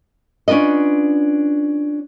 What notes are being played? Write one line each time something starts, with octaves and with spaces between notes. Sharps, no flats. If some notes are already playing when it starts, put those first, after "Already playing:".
C#4 D4 F4 B4 D#5